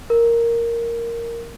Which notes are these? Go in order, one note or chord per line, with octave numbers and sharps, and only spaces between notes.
A#4